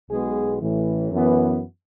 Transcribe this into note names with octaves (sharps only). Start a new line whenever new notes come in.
B1 B2 G#3 B3 G#4
A1 A2 E3
F#2 E3 B3